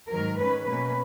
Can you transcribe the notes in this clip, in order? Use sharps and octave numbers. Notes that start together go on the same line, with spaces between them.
G#2 D#3 F#3 A#4
G#2 D#3 G#3 C#4 B4
B2 F#3 A#3 C#4 B4